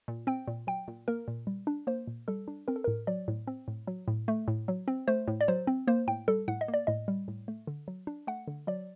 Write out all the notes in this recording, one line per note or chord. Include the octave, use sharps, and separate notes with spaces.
A#2
C4 G5
A#2
F#3 G5
A#2
A#3 A#4
A#2
G3
D4
A#3 C5
A#2
G3 A4
D4
C4 A#4
A4
A2 A#4
F#3 D5
A2
C4
A2
F#3
A2
A3
A2
F#3
C4
A3 C5
A2
D5
F#3 C5
C4
A#3 C5
A2 G5
G3 A4
A2 F#5
D#5
A#3
D5
A2 D#5
G3
A2
A3
D3
F#3
D4
A3 F#5
D3
F#3 D5